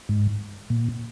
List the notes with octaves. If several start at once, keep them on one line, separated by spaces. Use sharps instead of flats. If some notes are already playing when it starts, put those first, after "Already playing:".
G#2
A#2